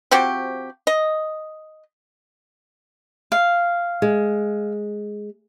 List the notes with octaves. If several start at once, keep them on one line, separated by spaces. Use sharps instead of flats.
F3 C4 F#4 G4
D#5
F5
G#3